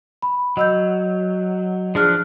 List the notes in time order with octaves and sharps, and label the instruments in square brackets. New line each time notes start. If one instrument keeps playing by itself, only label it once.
[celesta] B5
[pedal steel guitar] F#3 [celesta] D#5 E6 G6
[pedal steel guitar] F3 D4 [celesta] G#4 F6 F#6